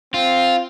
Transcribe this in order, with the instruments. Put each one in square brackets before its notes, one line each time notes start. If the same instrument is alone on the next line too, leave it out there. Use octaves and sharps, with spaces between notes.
[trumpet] C4 [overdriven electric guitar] F4